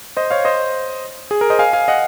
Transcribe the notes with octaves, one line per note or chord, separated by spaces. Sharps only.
C5 D#5
C#5 F5
C5 D#5
G#4
A#4
C5 D#5
F5 G#5
F5 G#5
D#5 F#5